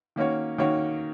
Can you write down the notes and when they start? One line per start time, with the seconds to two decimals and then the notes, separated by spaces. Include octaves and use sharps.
0.16 D#3 A#3 C#4 F#4 C#5
0.58 D#3 A#3 C#4 F#4 C#5